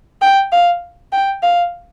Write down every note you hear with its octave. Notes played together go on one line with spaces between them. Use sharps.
G5
F5
G5
F5